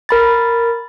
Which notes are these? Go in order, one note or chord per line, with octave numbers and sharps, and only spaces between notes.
A#4 B5 A6